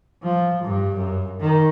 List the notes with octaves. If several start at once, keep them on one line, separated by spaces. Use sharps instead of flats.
F3
G2
F#2
D#3